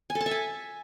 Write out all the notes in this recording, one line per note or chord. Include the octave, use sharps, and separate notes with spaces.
G#5
A4
A5
E5
G#5